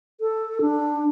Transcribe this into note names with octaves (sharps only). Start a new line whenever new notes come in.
A4
D4